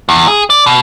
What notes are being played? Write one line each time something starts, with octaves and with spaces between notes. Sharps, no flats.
E2
G#4
D5
B2